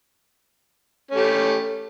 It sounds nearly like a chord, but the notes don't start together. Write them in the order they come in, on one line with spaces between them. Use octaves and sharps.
C#4 A3 G4